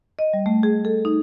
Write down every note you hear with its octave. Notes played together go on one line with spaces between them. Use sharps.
D#5
G3
A3
G#4
A4
D#4